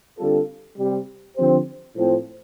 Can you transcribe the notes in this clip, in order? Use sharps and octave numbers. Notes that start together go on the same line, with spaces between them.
D3 G3 C4 F4 A4
C3 G3 C4 G4
D3 F3 C4 G4 C5
A2 F3 C4